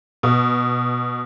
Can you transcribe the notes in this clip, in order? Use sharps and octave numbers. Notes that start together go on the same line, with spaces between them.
B2